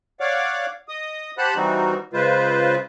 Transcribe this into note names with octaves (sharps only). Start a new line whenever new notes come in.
C#5 D5 F5 F#5 D6
D#5 D#6
G4 C5 F#5 A5 B5 F#6
E3 G3 C4 D#4 F#4
C#3 G#3 F4 B4 C5